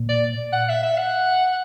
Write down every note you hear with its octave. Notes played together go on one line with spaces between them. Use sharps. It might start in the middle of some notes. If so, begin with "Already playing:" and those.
Already playing: A#2
D5
F#5
E5
E5
F#5